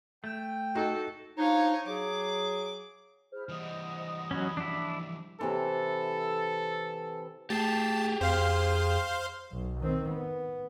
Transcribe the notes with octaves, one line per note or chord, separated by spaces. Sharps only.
A3 G5
D#4 F#4 A4
F3 D4 D#4 C#5 F5
F#3 G#4 D6
E4 G#4 C5 F6
E3 G3 D#5 F#5 D#6
F#3 C#4 B5
F3 D4 E4
C3 E3 A4
A3 G4 G#4 G5 A5
F2 C5 F5 C6
B1
D#3 C4
B3